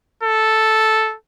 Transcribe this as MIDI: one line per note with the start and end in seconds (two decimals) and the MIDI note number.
0.23 1.15 69